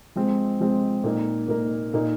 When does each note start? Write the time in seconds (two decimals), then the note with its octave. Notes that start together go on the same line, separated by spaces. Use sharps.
0.16 F3 G#3 C4
0.60 F3 G#3 C4
1.04 A#2 A#3 D#4
1.48 A#2 A#3 D#4
1.94 A#2 A#3 D#4